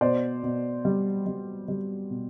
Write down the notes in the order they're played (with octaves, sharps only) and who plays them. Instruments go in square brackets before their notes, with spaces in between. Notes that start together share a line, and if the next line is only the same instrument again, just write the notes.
[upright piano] B2 C5 D5
B2
G3
G3
G3
B2